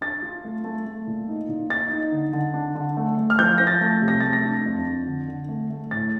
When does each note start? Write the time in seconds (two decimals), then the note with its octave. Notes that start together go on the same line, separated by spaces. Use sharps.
0.01 D4 A6
0.22 F4
0.45 A3
0.64 A3
0.85 A3
1.07 A#2
1.29 D#4
1.49 A#2
1.70 D#4 A6
1.92 D#4
2.12 D3
2.33 D3
2.54 D4
2.75 D3
2.97 A3
3.18 A3
3.30 F6
3.39 F3 G6
3.58 F3 A#6
3.67 A6
3.81 A3
4.02 C3
4.08 A#6
4.21 A3 A6
4.33 A#6
4.44 D4
4.66 F2
4.86 D4
5.07 D3
5.28 D3
5.49 A3
5.71 A3
5.91 A2 A6